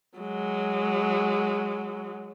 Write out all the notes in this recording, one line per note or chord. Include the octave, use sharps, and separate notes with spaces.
F#3 G#3